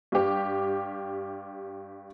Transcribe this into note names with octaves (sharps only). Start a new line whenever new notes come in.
G2 G4